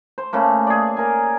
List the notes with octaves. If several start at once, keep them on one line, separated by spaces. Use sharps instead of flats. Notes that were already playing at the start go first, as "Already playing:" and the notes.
C5
C#3 A3 A#3
G#4 D5
A#4 G#5